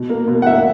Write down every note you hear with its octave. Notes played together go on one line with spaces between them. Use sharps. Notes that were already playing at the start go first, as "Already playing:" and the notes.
Already playing: B2
A#3
B2
F#5
A#3 E5